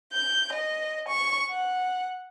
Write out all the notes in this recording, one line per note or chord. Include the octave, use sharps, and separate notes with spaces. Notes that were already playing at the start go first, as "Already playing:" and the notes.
G6
D#5
C#6
F#5